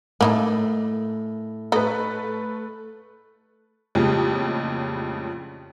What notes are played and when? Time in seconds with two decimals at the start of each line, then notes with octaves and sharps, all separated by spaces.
0.21 A2 A#3 D#4 E4
1.72 A3 D#4 B4
3.95 A1 F2 A#2 C#3 G3 G#3